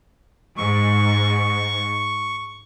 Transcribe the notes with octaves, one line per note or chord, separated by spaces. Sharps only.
G#2 C#6